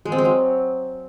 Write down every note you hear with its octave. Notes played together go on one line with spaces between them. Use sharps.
G#3
C4
G#3
F#3